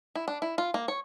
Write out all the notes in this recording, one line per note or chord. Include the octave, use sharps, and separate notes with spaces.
E4
D4
E4
F4
A#3
C#5